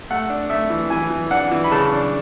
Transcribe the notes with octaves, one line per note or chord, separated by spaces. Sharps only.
A3 F#5
D4
A3 E5
E3
E3 G#5
E3
D4 F#5
E3
B5
C#3 A5
D4